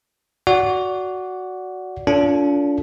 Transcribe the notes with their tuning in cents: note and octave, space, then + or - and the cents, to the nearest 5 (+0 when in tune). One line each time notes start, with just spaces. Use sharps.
F#4 +0 D5 -20 F#5 +0
D4 -40 F4 +0 A4 +0